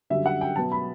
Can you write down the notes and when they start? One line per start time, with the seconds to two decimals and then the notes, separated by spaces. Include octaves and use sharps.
0.10 F#2 D3 G3 E5
0.26 F#5
0.41 G5
0.56 B2 F#3 B3 A5
0.72 B5